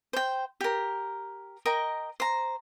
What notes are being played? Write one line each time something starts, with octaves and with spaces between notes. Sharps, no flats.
C5 G5
G4 A#4
A#4 D#5 G5
C5 A#5